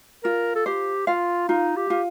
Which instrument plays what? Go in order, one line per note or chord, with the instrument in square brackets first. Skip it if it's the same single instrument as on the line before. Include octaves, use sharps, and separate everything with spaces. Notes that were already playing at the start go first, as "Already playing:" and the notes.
[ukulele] F4 [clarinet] A#4
[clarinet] A4
[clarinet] G4 [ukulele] C5
[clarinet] F4 [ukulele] F5
[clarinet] D#4 [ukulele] F4
[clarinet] G4
[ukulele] F4